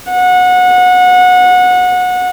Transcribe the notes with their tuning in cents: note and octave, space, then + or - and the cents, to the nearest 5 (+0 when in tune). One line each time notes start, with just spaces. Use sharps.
F#5 -25